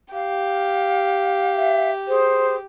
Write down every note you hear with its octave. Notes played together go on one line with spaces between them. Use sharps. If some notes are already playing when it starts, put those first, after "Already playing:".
G4 F5
E5
G#4 C5